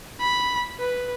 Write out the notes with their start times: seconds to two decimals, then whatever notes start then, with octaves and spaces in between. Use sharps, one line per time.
0.20 B5
0.79 B4